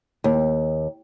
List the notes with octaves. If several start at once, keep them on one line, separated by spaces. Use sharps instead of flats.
D#2